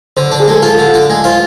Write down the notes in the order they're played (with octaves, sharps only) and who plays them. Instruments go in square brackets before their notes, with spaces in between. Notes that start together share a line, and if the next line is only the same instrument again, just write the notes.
[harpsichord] D3 [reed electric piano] C5
[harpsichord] D4
[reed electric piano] G#4
[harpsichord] G#3 [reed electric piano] A4
[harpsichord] F4 [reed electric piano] A4
[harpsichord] D3
D4
G#3
[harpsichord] F4 [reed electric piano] C5